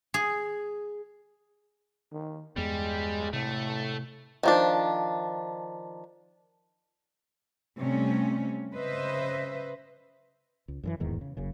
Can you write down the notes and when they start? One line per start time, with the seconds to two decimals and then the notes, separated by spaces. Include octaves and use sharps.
0.14 G#4
2.12 D#3
2.56 E2 G2 G3 G#3 B3
3.33 A2 C3 A3
4.43 D#3 F3 D4
7.77 C3 G3 A3 C4 C#4
8.72 C#3 B4 C5 D#5 E5
10.68 C#2
10.84 F#2 D3 E3
11.00 D1 E2 G#2 D#3
11.21 C#3
11.37 F#1 F#2 C#3